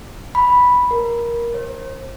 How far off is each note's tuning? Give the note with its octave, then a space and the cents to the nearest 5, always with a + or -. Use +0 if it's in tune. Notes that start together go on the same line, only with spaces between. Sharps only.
B5 -5
A#4 +15
C5 +40